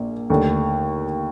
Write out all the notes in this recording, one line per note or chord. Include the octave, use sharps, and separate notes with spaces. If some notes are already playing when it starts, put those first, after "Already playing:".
Already playing: A#1 A#3
D#2 D3 A3